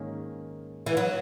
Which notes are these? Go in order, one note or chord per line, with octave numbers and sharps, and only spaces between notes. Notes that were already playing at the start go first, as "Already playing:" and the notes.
Already playing: G#2 D#3 A#3 C#4
E3
F#3